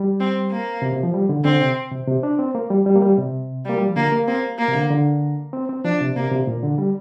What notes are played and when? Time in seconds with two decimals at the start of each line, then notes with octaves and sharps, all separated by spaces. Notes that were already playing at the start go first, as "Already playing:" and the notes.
Already playing: G3
0.20 C4
0.51 A#3
0.82 C3
0.93 C3
1.03 F3
1.14 G3
1.29 D3
1.45 D3 C4
1.61 C3
1.92 C3
2.08 C3
2.23 D4
2.39 C4
2.55 A#3
2.71 G3
2.86 G3
2.95 A#3
3.02 G3
3.18 C3
3.65 G3 A#3
3.78 G3
3.87 F3
3.96 D3 A#3
4.12 A#3
4.28 A#3 C4
4.59 A#3
4.68 C3
4.75 D3
4.90 D3
5.53 C4
5.69 C4
5.84 F3 D4
6.00 C3
6.16 C3 A#3
6.31 C3
6.47 A#2
6.63 D3
6.78 G3